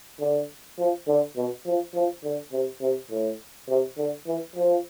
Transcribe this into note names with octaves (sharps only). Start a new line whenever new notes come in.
D3
F3
D3
B2
F3
F3
D3
C3
C3
A2
C3
D3
E3
F3